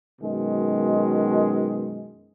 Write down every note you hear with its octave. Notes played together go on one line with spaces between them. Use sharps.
F#2 B2 D#3 G#3